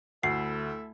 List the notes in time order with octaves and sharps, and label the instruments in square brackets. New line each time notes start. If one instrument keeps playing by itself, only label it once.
[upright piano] D2 [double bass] A3 E4 [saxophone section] A4 E5 [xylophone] C7